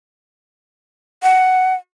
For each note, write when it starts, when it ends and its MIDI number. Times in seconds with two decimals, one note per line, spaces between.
1.23 1.74 78